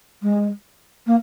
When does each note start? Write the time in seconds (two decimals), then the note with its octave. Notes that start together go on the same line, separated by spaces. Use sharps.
0.22 G#3
1.06 A#3